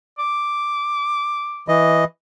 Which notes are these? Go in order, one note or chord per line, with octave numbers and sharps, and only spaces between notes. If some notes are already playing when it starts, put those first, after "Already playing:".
D6
E3 D#5